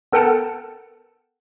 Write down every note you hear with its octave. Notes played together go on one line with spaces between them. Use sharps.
B3 A4 A#4 F#5 G5 A5